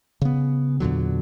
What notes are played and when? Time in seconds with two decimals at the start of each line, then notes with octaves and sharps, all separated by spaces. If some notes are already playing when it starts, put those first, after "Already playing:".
0.22 C#3 B3
0.80 E2 A#2 D3 F#3